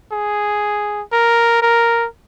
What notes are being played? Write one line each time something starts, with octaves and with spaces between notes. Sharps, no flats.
G#4
A#4
A#4